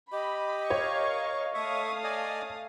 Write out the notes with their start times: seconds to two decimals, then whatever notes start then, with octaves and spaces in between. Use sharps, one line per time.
0.12 G4 D#5 B5
0.70 A#4 C#5 F5 C#6
1.54 A3 E5 F5 C#6 D#6
2.04 D5 D#5 G#5